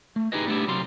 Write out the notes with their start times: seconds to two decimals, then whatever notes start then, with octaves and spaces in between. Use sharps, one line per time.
0.16 A3
0.32 D#4 E4 G4 G#4 B4 D#5
0.47 G3 A3 B3 D4 E4 G4
0.67 C2 F#3 G3 F5 C6